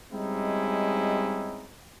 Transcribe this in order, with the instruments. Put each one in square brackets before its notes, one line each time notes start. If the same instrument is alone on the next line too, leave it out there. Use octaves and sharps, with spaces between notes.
[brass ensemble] G3 G#3 C4 C#4 D#4 E4